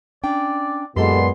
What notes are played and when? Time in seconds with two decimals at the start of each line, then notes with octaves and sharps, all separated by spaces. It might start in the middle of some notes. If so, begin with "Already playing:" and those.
0.24 C#4 D4 D5 G5
0.97 F#2 A#2 G#3 B3 G4 A4 C6